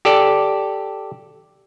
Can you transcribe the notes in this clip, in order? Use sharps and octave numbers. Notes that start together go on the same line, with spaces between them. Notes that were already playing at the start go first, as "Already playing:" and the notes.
G4 A4 D5